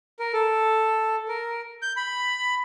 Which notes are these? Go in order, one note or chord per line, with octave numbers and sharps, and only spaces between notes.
A#4
A4
A#4
G6
B5